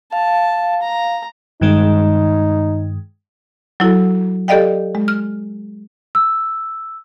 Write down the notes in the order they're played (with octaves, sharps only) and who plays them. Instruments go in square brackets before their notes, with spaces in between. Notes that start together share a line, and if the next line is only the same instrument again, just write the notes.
[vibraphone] F5 [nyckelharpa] A5
[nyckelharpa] A#5
[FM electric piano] G2 D#3 G#3 [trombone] D#4
[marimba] F#3 E4 F#4 A4
G4 A4 D5 D#5 F5 G5
G#3
F6
[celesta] E6